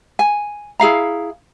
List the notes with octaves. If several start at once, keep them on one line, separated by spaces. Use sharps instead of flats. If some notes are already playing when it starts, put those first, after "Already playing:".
G#5
E4 G#4 F5 A#5